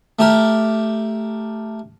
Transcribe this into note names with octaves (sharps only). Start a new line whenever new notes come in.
A3 G4 A#4